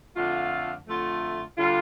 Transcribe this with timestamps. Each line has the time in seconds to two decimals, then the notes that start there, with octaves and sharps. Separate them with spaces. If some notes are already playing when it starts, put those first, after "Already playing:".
0.16 F2 D3 A3 F4
0.85 F2 D3 A3 F4
1.56 D3 G3 F4